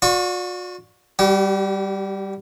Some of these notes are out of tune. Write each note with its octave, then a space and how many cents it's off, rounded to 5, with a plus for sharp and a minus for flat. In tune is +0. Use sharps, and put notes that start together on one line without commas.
F#4 -45 D5 +0 C#6 +0
G3 +0 G4 -45